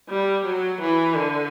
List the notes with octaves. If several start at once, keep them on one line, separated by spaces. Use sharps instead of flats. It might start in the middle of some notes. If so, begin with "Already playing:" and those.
G3
F#3
E3
D3